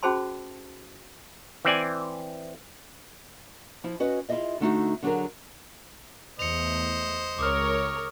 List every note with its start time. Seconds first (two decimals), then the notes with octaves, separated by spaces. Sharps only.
0.03 C#4 F#4 G#4 C5 A5 C6
1.65 E3 C4 D5 G#5
3.84 F3 E4
4.00 C#4 F#4 B4 D#5
4.29 E4 F4 G4 G#4 D#5 E5
4.60 D3 A3 D#4 F#4
5.02 D3 F#3 D4 G#4 A#4
6.39 E2 A3 C5 D#5 C#7 F7
7.39 C#2 A#4 C#5 D6 D#6 F6